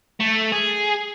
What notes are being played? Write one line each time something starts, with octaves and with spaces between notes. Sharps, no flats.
A3
G#4